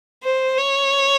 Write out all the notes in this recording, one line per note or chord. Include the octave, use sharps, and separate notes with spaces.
C5
C#5